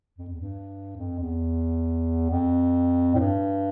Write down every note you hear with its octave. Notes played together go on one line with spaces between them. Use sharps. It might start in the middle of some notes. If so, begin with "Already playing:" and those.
F2
E2
G2
F2
E2
F2
A2
G2